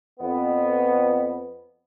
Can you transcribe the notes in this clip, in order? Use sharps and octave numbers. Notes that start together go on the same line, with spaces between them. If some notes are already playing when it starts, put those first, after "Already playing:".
F2 B3